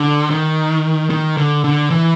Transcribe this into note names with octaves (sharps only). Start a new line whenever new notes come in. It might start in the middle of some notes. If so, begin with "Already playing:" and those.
Already playing: D3
D#3
D#3
D3
D3
E3